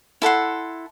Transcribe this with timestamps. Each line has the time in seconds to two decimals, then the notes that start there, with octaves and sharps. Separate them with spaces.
0.22 E4 A4 F#5 C6